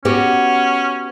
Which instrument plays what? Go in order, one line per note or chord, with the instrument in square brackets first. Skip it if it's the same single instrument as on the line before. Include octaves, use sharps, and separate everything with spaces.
[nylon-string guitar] B3 F#4 G4 [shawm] C#4